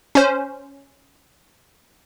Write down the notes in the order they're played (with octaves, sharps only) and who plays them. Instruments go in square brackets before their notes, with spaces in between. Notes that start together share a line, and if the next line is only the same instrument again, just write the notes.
[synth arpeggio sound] C#4 C5